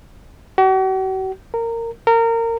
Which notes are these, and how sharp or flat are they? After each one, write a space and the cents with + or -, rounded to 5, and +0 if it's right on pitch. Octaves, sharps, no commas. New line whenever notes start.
F#4 +45
A#4 -20
A#4 -25